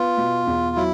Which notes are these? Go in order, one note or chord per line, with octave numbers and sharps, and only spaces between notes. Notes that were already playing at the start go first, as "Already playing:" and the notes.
Already playing: B3 F4
B2
E2
F#3 E4